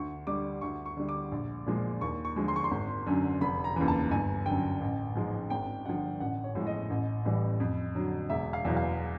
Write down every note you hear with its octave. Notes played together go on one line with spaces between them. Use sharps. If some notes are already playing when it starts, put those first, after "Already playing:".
Already playing: D2 C#6
D3 G3 D6
D2 C#6
C#6
D3 G3
D6
A#1
A#2 F3 G#3
D#2 C#6
C#6
D3 F3 G#3
C6
C#6
C6
G#1
F#2 D3
F1 B5
A#5
D#2 C#3 E3
A5
G1 G#5
F#2 D3 G5
A1
G#2 F3 G#3
G#1 G5
G2 D3 F3 F#5
A1 F#5
C#5
A2 F3 G#3
D#5
A1
A2 E3 G3
F2
D3 F#3
E1 E5
F5
E2 B2 F#3
F5